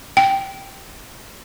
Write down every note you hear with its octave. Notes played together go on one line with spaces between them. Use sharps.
G5